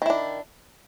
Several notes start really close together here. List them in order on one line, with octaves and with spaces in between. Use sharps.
D#3 E4 D4